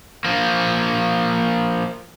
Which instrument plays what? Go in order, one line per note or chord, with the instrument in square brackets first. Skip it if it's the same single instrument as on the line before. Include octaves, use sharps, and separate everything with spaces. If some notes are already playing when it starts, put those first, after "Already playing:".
[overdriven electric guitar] F3 A#3